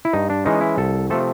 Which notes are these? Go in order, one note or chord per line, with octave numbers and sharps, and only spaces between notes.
E4
G2 D#4
D4
E3 G#3 C#4 D#4
E4
C2 A4
C3 F3 A3 C4 A4